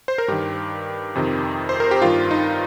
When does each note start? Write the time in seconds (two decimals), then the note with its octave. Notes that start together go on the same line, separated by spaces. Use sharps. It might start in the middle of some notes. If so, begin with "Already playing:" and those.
0.08 C5
0.18 A#4
0.28 G2 D#3 G4
1.15 F2 C3 D#3
1.69 C5
1.80 A#4
1.91 G4
2.02 G2 D#3 F4
2.31 D#4